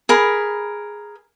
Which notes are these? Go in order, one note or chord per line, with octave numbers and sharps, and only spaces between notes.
G#4 A#4 B5